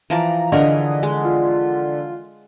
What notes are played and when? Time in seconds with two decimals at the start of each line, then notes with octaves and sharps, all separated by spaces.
0.10 E3 F3 D5 A#5
0.52 D3 G#4 A#4 C#5 D#5
1.03 G#3
1.24 F4